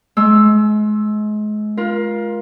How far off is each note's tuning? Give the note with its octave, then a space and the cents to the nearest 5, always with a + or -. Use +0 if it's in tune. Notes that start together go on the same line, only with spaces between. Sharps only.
G#3 +35 E6 +0
F4 +0 A#4 +30